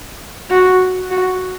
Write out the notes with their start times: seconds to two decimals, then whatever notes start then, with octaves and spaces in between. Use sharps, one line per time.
0.50 F#4
1.11 F#4